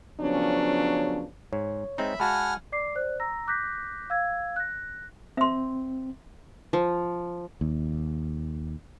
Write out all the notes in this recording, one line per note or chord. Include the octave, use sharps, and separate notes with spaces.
C#3 F3 F#3 B3 C#4 D4
G#2 C#5
G#3 C4 D#4 E5 B5
G#3 F#4 F5 F#5 G#5 A5 B5 F6
D5 D6 C7
C5 D5 F#6
A#5 E6 A#6
D6 F#6 G6 A#6 B6
F5 E6 G#6
F#6 A#6
C4 E5 C6
F3
D#2